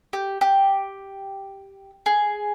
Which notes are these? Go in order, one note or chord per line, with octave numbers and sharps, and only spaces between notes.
G4
G4
G#4